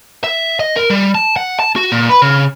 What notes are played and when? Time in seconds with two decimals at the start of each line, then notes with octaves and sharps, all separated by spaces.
0.24 E5
0.59 D#5
0.76 A#4
0.90 G3
1.15 A5
1.36 F#5
1.59 A5
1.76 F#4
1.92 A#2
2.09 B4
2.22 C#3